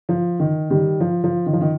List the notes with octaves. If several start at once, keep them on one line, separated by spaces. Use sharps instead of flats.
F3
D#3
D#3 G3
F3
F3
D#3
F3
D#3